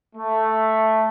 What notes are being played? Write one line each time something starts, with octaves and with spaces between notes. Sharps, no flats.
A3